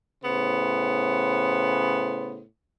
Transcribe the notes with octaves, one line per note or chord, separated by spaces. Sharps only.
A2 C#3 B3 C5